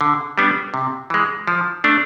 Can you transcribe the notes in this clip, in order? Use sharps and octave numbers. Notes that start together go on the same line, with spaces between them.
D3
G3 B3 D4
C3
E3 G#3
F3
A3 D4